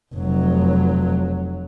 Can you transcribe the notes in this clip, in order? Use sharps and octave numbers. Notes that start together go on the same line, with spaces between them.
F1 F#3